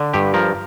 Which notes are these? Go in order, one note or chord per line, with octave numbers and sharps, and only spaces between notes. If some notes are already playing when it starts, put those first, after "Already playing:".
Already playing: D3
G2 G4
F3 A#4